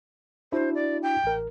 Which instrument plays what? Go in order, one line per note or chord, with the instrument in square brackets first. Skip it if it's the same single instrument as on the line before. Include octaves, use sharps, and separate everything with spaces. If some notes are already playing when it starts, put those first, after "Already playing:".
[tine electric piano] D4 E4 F#4 [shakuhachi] C5
[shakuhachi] D5
G5
[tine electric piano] A1 A#4